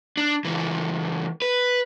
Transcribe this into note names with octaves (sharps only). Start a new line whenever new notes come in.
D4
C#2 E3
B4